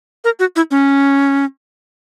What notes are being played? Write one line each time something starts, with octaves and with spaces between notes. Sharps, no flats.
A#4
F#4
E4
C#4